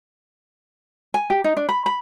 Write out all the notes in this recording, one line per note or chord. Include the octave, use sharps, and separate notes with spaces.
G#5
G4
D#4
D4
B5
B5